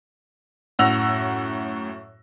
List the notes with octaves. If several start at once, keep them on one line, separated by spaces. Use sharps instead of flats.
F#2 A2 F#5 E6 A#6 F7